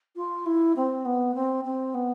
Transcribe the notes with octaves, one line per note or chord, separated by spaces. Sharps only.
F4
E4
C4
B3
C4
C4
B3